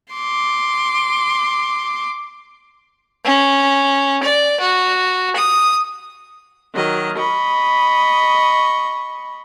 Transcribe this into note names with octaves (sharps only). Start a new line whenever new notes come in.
C6 D6
C#4
D5
F#4
D#6
D#3 F#3 D#5
D#5 B5 C#6